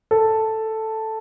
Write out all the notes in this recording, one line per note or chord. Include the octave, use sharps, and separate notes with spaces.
A4